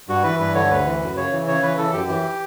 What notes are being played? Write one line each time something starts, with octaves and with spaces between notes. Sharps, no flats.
G2 F#4
E3 B4
G2 B4
D3 C#5
D2 B4
E3
F#2
C#3 C#5
E3
C#3 C#5
E3 B4
E3 A4
F#2 G4
E3